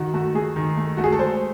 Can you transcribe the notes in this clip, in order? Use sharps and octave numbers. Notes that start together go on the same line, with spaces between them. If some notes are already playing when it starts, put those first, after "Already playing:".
Already playing: D#3 F#4
A3 F#4
A3 G#4
D#3
A3
A3 F#4
G#4
A4
G#3 C5